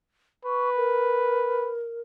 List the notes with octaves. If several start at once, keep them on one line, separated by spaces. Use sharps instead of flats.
B4 C#6
A#4